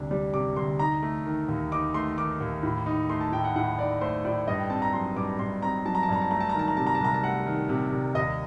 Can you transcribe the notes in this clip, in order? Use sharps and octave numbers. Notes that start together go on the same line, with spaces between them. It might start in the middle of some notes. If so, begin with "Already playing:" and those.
Already playing: D2 C3 G3 D4
G3
C3 D6
D2 C6
D#4 A#5
A3
D#3
D#2
D#4 D6
A3 C6
D#3 D6
D#2
A2
D#4
A3 C6
A5
A2 G5
F#5
A2 F#5
D#4 D5
A3 C5
A2 D5
G2 D#5
G5
C4 A5
A#5
F#3 C6
G2 D6
G2 C6
C4 A#5
F#3 A5
A#5
A5
G2 A#5
A5
A3 A#5
A5
A#5
D#3
A5
A#5
C3 A5
A#5
A5
C2 A#5
A5
A3 F#5
D#3
C3
C2
D#2 D#5